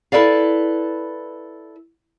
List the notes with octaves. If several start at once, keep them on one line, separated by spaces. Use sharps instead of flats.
E4 A4 B4 D5 F5